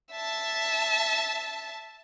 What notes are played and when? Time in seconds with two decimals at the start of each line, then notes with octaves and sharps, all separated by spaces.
0.12 E5 A5